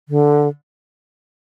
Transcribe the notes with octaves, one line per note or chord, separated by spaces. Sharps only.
D3